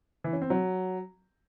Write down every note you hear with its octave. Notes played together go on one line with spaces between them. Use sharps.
E3
C#4
C4
F#3